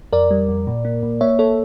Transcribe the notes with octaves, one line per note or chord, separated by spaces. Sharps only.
F2 A#4 D5
G3
F2
A#2
A#3
A#2
A#3 C#5 E5
A#3 A4 C#5